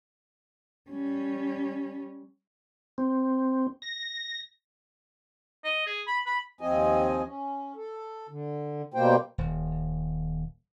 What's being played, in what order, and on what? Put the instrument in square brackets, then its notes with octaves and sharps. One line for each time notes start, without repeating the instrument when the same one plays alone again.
[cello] G3 C#4
[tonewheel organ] C4
A#6
[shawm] D#5
G#4
B5
B5
[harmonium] D#2 F3 C4 D#5 G#5
C#4
A4
D3
B2 G3 A#3 C5 G5
[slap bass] D#1